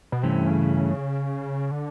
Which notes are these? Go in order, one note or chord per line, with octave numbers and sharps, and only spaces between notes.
B2
G2 C3 E3 A3 C#4 E4
C#3
D3